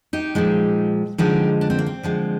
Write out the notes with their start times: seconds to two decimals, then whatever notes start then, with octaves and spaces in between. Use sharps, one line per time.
0.13 D#4 G4
0.35 A#2 F3 G#3
1.18 D3 F3 G#3 D#4 G4
1.61 D4
1.70 C4
1.79 A#3
1.86 C4
2.03 D3 F3 G#3